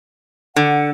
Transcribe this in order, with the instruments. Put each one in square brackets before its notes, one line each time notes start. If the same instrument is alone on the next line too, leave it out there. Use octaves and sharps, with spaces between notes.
[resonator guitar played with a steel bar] D3 [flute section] F#5